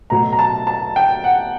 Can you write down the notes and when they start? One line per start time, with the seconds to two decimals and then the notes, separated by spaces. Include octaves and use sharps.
0.10 B2 F#3 A3 A#5
0.33 A#5
0.39 A5
0.67 A5
0.96 G5
1.24 F#5